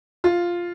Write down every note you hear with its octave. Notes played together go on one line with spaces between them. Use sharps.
F4